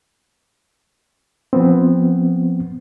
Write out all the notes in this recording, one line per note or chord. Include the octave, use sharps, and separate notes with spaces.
F3 B3 C4